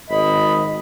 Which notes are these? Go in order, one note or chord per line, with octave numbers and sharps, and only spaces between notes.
G#1 D#5 B5